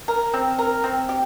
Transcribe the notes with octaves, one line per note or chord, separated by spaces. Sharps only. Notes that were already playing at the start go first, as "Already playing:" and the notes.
A#4
C4
A#4
C4
G4